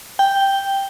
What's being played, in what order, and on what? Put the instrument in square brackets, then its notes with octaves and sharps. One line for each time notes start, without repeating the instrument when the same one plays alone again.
[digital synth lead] G5